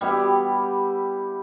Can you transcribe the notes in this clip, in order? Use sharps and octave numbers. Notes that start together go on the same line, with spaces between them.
G3 B3 E4 G4